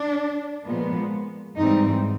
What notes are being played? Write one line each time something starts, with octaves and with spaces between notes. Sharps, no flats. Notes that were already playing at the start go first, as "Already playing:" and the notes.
Already playing: D4
A#2 F3 G#3 B3
G#2 E3 G3 C4 D#4